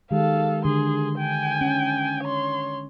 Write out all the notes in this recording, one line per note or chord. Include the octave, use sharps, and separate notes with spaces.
D#3 G#3 G4 A4 F5
D3 G#4 C6
G5 G#5
C#4
C#5 C6